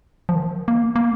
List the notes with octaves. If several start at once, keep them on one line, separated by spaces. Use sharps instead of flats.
F3
D#3
A#3
A#3